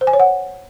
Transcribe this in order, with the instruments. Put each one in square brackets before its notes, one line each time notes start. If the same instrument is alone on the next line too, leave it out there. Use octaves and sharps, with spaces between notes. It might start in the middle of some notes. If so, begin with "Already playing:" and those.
[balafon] C5
G#5
C#5
F#5